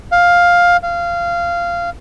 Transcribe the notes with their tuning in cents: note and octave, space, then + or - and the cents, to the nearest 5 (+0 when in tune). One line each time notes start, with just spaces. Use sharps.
F5 +10
F5 -15